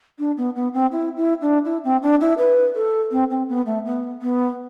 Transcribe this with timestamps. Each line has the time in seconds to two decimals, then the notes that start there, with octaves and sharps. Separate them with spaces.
0.19 D4
0.37 B3
0.56 B3
0.74 C4
0.92 E4
1.17 E4
1.42 D4
1.65 E4
1.84 C4
2.03 D4
2.21 E4
2.38 B4
2.75 A4
3.11 C4
3.31 C4
3.49 B3
3.66 A3
3.85 B3
4.22 B3